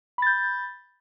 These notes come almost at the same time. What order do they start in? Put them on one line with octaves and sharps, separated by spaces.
B5 A6 G6